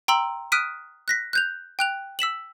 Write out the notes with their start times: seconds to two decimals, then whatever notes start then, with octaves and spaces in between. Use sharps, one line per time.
0.08 G5 A#5 C6 E6 F#7
0.52 D#6 F6 F#6 B6 D7 D#7
1.08 F#6 A#6 B6
1.33 F#6 G6 F7
1.79 G5 F#6 F7
2.19 E6 B6 E7 F#7